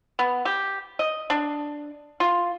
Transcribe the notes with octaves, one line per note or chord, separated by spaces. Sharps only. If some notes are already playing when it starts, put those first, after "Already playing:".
B3
G4
D#5
D4
F4